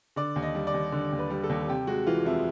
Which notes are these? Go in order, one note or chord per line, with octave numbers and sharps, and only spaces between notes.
D3 D5
D#2
D#5
G3
D5
D#2
D3
D#2
B4
G3
A4
D#2
C3 G4
G#3 F#4
E3 F4
F2 E4